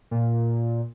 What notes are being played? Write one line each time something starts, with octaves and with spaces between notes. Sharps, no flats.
A#2